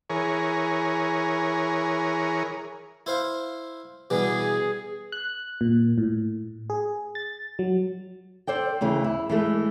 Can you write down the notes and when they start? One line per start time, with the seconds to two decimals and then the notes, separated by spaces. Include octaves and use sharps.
0.10 E3 G#4 A#4 C#5
3.06 E4 C5 F5
4.10 B2 E3 G3 G#4
5.12 F#6
5.61 A#2
5.98 A2
6.70 G#4
7.15 A6
7.59 F#3
8.47 A4 C5 D5 G5
8.81 D2 C#3 E3
9.04 E4
9.30 E3 G#3 A3